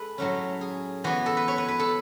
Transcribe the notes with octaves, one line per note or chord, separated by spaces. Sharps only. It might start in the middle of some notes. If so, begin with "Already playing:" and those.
Already playing: G#3 A4 B4
A2 F#3 A3 C#4
G#4
E3 B3 F#4
A4
B4
C#5
B4
B4
A4